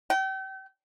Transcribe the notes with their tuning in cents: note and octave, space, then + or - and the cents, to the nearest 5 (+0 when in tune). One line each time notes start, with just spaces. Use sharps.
G5 -35